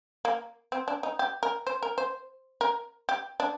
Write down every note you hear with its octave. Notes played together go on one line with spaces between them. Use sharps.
A#3
C4
D4
D#4
G4
A#4
C5
A#4
C5
A#4
G4
D4